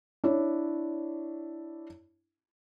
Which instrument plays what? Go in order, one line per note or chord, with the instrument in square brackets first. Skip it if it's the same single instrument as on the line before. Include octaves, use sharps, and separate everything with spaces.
[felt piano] D4 E4 C#5